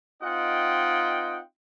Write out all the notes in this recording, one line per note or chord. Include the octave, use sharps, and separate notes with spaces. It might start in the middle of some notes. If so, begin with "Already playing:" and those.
C4 D#4 F4 D#5 F#5 G5